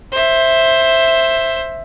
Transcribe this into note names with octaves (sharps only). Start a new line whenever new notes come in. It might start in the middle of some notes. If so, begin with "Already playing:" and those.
C5 E5